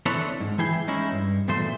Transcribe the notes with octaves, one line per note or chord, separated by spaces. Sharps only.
E3 C4 D4 A4 B4 C#5
G#2
E3 E4 G#4 G5
G#3 C#4 D#4 E4
G2
B1 E2 A#2 A3 C5